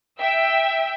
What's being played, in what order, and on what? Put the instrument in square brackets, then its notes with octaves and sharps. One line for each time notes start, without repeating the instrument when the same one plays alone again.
[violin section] E5 G5 E6